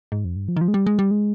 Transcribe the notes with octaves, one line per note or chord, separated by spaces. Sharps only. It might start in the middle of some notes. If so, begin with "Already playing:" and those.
G#2
F2
G2
F3
D#3
F3
G#3
G3
G#3
G3
G#3